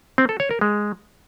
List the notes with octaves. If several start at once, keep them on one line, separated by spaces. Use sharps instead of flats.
C4
A4
C#5
A#4
G#3